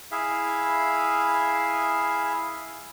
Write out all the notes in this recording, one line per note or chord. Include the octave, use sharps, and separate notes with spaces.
E4 G#4 E5 F5